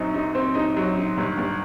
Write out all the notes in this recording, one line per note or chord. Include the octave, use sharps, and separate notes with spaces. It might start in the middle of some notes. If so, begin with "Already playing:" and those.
Already playing: F#2 F#3 C4 D#4
D#4
C4
D#4
F#3
D#4
G1
G1